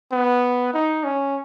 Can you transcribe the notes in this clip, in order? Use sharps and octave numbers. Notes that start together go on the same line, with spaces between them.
B3
D#4
C#4